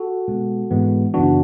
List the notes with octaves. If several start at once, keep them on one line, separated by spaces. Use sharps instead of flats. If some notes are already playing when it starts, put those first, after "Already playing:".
Already playing: F#4 A4
B2 G#3 B3
G#2 E3 G#3 B3
F#2 C#3 E3 B3 D4 F#4